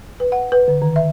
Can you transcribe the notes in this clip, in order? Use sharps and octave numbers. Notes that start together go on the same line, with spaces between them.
B4
F#5
B4
D3
D#3
E5